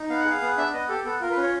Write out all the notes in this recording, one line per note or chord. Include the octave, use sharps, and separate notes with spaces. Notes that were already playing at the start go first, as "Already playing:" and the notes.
Already playing: D#4
B3 F5
F#5
G#4 F5
B3
D4 E5
B3 D#5
G4 A4
B3 A4
F4 A#4
B4
C#4
C#5